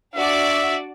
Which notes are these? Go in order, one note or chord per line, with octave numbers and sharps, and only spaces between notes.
D4 F#4 D5 E5